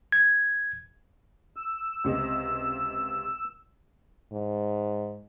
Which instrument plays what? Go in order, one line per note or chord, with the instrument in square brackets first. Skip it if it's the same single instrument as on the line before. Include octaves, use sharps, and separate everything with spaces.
[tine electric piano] G#6
[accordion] E6
[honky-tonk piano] C#2 C3 D#5
[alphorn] G#2